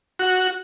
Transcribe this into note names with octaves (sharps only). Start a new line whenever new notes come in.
F#4